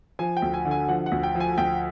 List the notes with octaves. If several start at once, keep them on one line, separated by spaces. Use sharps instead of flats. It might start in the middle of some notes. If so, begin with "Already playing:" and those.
F3 G#5
G5
D2
G#5
D3
G#5
F3 F#5
F#5
D2
G5
F3
G#5
D2 G5